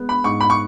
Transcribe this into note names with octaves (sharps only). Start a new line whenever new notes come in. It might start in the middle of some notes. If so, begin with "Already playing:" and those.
Already playing: G#3 B3
B5
G#2 C#6
B5
C#6